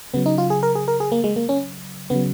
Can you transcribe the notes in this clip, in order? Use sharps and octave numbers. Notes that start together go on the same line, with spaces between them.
C#3 F#3 B3
D#4
F4
G#4
A#4
G#4
A#4
G#4
A#3
G#3
A#3
C#4
C#3 F#3 B3